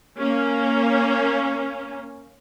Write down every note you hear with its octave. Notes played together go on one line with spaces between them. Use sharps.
A#3 C#4